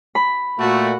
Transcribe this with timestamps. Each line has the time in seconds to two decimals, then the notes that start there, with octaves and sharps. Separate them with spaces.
0.15 B5
0.59 A#2 A3 F#4